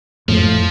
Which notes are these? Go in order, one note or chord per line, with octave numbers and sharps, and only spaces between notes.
F2 A2 F3